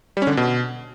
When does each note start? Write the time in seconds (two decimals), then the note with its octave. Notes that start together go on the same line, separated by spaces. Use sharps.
0.17 G3
0.22 C#4
0.27 D3
0.32 D4
0.37 B2